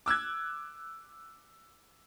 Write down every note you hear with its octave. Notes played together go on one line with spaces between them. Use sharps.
D6 E6 F#6 G#6